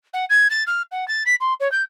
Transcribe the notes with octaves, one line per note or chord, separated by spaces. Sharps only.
F#5
G#6
A6
F6
F#5
A6
B6
C6
C#5
G6